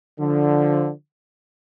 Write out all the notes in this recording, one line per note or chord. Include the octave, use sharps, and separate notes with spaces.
D3 F3